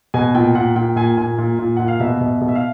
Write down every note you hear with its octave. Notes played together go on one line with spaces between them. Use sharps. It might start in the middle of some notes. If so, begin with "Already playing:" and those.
B2 G#5
A#2 G5
A#2 F#5
A#2 G5
A#2 G#5
A#2 G#5
A#2
A#2
A#2 F#5
F5
B2 E5
B2
B2
E5
F5